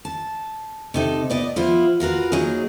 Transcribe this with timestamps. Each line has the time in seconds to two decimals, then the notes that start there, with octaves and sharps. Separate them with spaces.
0.05 A5
0.94 C3 D#4 A4
1.30 B3 D5 D#5
1.56 F3 B3 E4 F4
2.00 F4 F#4 A#4 B4
2.32 F#3 A#3 D#4 G#4